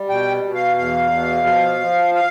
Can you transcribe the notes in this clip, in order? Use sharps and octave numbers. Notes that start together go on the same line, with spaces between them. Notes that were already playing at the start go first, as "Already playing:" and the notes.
Already playing: G3
B2 G5
B2
F5
E2 F5
B2
F3
F3
F5